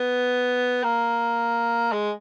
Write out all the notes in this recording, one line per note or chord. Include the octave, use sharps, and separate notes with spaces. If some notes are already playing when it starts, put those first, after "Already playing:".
Already playing: B3
A#3
G#3